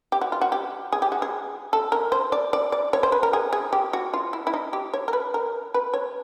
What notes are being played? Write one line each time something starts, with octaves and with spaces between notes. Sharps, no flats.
G4
F#4
F4
F#4
G4
G#4
G4
F#4
G#4
A4
A#4
C5
D5
D5
D5
C#5
C5
B4
A#4
G#4
G#4
G4
F#4
F4
E4
E4
D#4
G4
C#5
A#4
B4
A#4
B4
C#5